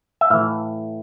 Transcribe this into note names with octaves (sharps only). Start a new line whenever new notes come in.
E5
A2 E3 F5